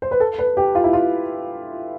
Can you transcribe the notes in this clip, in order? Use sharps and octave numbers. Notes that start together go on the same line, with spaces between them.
C5
B4
A4
B4
G4
F4
E4
F4